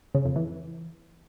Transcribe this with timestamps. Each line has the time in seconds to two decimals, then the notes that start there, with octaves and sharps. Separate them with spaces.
0.15 C#3
0.25 F2
0.36 E3